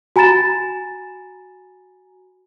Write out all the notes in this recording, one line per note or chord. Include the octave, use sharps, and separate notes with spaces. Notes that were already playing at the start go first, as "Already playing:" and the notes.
F#4 G#5 A#5 B5 A6 E7